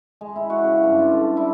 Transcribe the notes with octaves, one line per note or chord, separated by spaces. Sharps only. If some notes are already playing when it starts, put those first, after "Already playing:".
G#3
E4
F#4
C#3
G2
F4
D3
E4